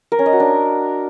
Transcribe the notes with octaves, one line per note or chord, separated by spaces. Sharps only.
A#4
C#4
D#5
F#4
D4